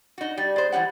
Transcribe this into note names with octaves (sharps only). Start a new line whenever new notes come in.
D#4 F#4
G3
G#3 C5
E3 F3 G3 F#5